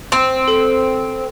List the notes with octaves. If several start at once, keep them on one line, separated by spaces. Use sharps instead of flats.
C4
A4